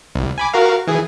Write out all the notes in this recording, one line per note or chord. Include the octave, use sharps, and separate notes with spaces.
C2
G#5 B5 D6
F#4 A#4 F5
E3 G#4